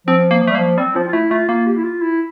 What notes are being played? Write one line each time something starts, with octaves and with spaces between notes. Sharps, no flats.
F3 C4
A#3
F3
A3
G3
A#3
F3
G3 C4
F3 F4
F4
A3 E4
A3 F4
A#3 F4
G4
E4
F4
E4